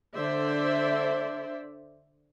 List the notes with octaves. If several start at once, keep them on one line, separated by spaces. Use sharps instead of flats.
D3 C5 D5 E5